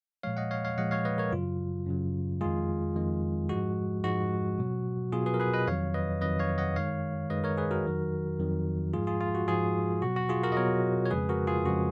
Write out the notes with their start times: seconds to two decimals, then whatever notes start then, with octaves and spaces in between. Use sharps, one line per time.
0.23 A#2 F3 G#3 C#5 F5
0.37 D#5 F#5
0.51 C#5 F5
0.65 C#5 F5
0.78 A#2 F3 G#3 D#5 F#5
0.91 C#5 F5
1.05 B4 D#5
1.18 A#4 C#5
1.32 F#2 C#3 F#3 F4
1.87 F#2 C#3 F#3
2.41 F2 D#3 G#3 F4 G#4
2.96 F2 D#3 G#3
3.49 G#2 F3 G#3 F#4
4.04 G#2 F3 G#3 F#4
4.58 B2 F#3
5.12 B2 F#3 F4 G#4
5.26 G#4 B4
5.34 A#4
5.40 G#4 B4
5.54 B4 D#5
5.67 F2 D#3 F#3 C#5 F5
5.94 B4 D#5
6.21 F2 D#3 F#3 B4 D#5
6.39 C#5 F5
6.58 D#5 F#5
6.76 F#2 D#3 G#3 C#5 F5
7.30 F#2 D#3 G#3 B4 D#5
7.44 A#4 C#5
7.58 G#4 B4
7.71 F#4 A#4
7.85 F2 D#3 F#3
8.39 F2 D#3 F#3
8.94 G#2 F3 G#3 F4 G#4
9.07 F4 G#4
9.21 F4
9.35 F#4
9.48 G#2 F3 G#3 F4 G#4
10.02 B2 F#3 F#4
10.16 F#4
10.29 F4 G#4
10.43 F#4 A#4
10.52 D#5
10.57 B2 F#3 A#4 C#5
11.05 C#5
11.11 F2 C#3 F3 G#3 G#4 B4
11.29 F#4 A#4
11.47 F4 G#4
11.65 F2 C#3 F3 G#3 F#4